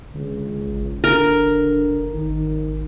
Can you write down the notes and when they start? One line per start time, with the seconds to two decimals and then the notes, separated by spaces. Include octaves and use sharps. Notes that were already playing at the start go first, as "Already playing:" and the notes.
0.15 C#2 D3
0.67 A1
1.04 F#1 D3 A#4
2.14 G#1 D#3